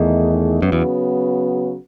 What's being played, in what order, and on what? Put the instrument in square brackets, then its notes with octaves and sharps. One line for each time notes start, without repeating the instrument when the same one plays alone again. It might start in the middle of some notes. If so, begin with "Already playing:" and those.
Already playing: [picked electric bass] E2 [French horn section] D#3 A3 D#4 G#4
[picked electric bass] F#2 [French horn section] C#3 F#3 B3
[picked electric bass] E2